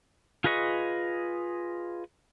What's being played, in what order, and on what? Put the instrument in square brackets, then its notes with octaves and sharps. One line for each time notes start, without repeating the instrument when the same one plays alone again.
[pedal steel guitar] F4 G#4 B4 D#5 C#6